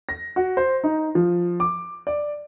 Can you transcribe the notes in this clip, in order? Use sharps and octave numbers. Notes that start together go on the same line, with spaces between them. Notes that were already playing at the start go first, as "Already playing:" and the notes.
A#6
F#4
C5
D#4
F3
D6
D5